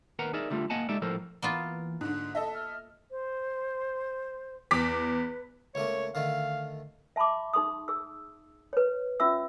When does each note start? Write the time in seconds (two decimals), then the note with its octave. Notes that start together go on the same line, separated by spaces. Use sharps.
0.19 D#2 A#4 B4 F#5 A#5
0.33 D#4 G#4 A#4 D5 E5
0.50 D3 G3 A3 F4
0.70 A#3 D#5 F#5 G#5 A5
0.89 G#3 D#4 G4 A4 D5 E5
1.02 A2 F3 A4 A#4 C5
1.42 E3 A#3 B3 F4
2.01 G#2 D3 F#6
2.35 A4 D#5 E5 A5
2.55 F6
3.11 C5
4.71 E2 B4 D6 B6
5.75 C#2 A3 A#3 C#5
6.15 D3 D#3 A3 F5
7.16 E5 A5 B5 C6 D6
7.54 D#4 G#4 C6 D#6
7.88 G#4 E6
8.73 B4 C#5
9.20 C#4 F4 E5 E6